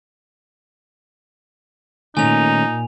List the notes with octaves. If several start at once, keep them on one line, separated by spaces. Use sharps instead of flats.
A#2 D#3 A3 C#4 D#4 G#5 F7